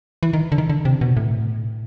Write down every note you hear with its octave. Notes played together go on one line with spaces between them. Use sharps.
E3
D#3
D3
D#3
D3
C3
B2
A2